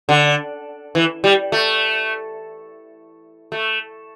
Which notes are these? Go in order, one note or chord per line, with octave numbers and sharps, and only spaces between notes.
D3
E3
G3
A3
A3